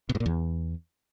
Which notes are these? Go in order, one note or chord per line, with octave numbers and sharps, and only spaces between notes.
B2
G#2
A#2
E2